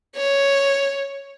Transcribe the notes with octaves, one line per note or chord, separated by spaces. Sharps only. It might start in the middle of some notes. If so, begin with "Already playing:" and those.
C#5